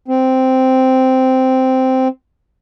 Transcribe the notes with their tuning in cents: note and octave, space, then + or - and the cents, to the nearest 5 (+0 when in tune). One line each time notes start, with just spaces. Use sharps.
C4 -5